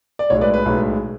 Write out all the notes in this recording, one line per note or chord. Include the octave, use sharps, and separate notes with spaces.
D5
B1 A2 G#3 C#5
B4 D5
B4
B1 A2 G#3